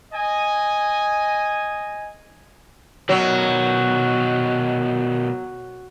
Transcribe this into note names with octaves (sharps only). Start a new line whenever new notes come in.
D#5 G#5
B2 D#3 F#3